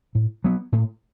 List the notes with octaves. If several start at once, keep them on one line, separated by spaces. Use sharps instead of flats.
A2
F#3 B3
A2